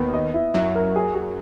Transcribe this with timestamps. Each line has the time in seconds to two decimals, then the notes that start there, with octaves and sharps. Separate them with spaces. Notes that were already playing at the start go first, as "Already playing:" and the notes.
Already playing: D#2 D#3 B3
0.14 D#5
0.34 E4
0.54 F#2 F#3 E4
0.75 A#4
0.96 G#4
1.15 G#4